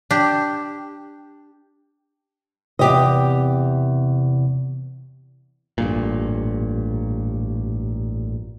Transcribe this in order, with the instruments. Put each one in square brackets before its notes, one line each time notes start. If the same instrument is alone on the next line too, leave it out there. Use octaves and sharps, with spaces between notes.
[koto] D4 G4
[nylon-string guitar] E2 G4 D#5 [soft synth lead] C3
[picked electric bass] A1 G2 A#2